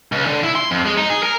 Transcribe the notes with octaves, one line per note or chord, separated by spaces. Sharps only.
C#2
D3
E4
C6
F2
G#3
D#4
G#4
A#4